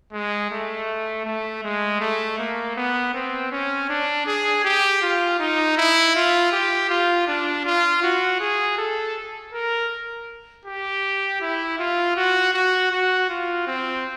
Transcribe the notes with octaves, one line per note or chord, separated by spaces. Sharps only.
G#3
A3
A3
G#3
A3
A#3
B3
C4
C#4
D4
G#4
G4
F4
D#4
E4
F4
G4
F4
D4
F4
F#4
G#4
A4
A#4
G4
E4
F4
F#4
F#4
F#4
F4
C4